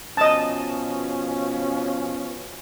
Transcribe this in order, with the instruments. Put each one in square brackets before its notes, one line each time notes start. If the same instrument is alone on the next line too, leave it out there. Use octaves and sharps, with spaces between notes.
[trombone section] B2 F3 C#4 [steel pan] D#5 A5